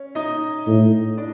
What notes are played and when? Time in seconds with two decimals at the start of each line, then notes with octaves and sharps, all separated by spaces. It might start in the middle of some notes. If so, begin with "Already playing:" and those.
Already playing: C#4
0.15 D#4 D#5
0.67 A2
1.18 D4 D5